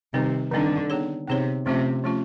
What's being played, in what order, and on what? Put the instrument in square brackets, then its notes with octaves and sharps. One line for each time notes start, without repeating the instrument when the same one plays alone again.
[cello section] C3 [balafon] D#3 G3 C4 D#4
[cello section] D3 [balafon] D#3 G3 C4 D#4
[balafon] B3 D#4 G#4 C#5
[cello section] C3 [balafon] B3 D#4 G#4 C#5
[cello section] C3 [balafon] F3 A3 C#4 F4
[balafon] F3 A3 C#4 F4